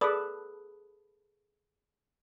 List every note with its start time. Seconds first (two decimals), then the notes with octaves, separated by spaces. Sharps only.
0.01 G#4 A4 B4 D5 B5 D6 D#6